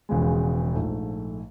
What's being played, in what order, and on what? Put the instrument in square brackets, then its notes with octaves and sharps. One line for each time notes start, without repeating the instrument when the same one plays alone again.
[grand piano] E1 E2 C#3 F3 G#3
A#1 G#2 F3 A3